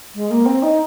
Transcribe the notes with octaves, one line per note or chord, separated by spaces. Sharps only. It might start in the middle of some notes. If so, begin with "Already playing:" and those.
G#3
A#3
C4
D#4